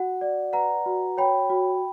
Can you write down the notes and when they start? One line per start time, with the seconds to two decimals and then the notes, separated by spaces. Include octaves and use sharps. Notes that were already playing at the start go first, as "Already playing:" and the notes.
Already playing: F#4 F#5
0.21 D5
0.53 B4 F#5 A#5
0.86 F#4
1.17 C#5 G5 B5
1.50 F#4